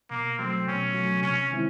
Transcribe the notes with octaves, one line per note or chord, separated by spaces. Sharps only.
B2 A#3
F#3 A3 C4
B2 C#4
F#3 A3
C3 C#4
D#3 G#3 C4 E4